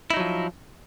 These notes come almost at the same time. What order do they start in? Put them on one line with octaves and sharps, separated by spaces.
E4 D#4 F#3 F3